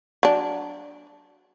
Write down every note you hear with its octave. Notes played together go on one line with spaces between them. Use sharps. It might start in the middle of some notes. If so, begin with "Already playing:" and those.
F#3 D4